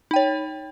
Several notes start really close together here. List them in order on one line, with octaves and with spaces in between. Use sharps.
D#4 G5 C#5